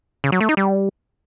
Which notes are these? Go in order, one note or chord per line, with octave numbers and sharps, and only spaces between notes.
C#3
F#3
A3
D#4
G3